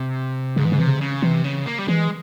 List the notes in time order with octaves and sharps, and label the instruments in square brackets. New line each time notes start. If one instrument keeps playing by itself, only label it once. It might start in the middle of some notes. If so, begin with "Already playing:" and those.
Already playing: [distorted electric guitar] C3
[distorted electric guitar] G#2 [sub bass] C#3
[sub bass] E3
C#3
[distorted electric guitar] C3 [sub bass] E3
[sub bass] C#3
[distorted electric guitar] C#3
[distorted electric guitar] C3 [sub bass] E3
[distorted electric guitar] C#3
A#3
G3
[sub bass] E3 [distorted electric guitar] G#3